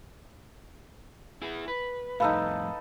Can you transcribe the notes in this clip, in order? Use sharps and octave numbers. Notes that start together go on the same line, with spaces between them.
E4 G#4
B4
F2 A2 D#4 A4 B4 F5